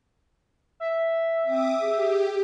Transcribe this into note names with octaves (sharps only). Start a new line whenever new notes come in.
E5
C4 D6 D#6
G4 G#4